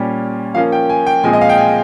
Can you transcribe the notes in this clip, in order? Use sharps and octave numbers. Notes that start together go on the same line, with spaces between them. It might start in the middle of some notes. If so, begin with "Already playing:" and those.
Already playing: A#2 G3 C#4
F3 A#3 C#4 F5
G5
G#5
G5
A#2 F3 G#3 C4 G#5
D#5
F5
G5
G#5